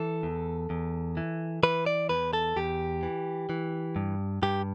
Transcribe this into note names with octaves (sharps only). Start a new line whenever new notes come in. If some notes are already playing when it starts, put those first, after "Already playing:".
Already playing: E3 A4
E2
E2
E3
E3 B4
D5
E2 B4
A4
E2 G4
E3
E3
G2
G2 G4